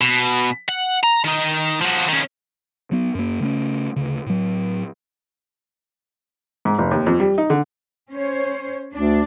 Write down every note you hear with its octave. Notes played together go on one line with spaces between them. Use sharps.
B2
F#5
A#5
D#3 D#4
F3 F#4
D#3 C#4
F#3 B3
F#2 A#3
C#3 A3 A#3 C#4
D2 C#3
A2 F#3
G#2
F1
D#2
F2
G3
D#4
D3
C#4 C5 C#5
D2 D4